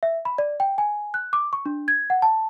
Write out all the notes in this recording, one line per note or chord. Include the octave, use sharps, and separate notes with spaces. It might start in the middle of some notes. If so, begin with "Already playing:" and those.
E5
B5
D5
G5
G#5
F#6
D6
C#6
D4
G#6
F#5
A5